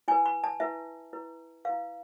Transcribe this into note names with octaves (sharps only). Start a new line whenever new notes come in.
E4 B4 G#5
B5
A5
E4 B4 E5
E4 B4
E4 B4 F5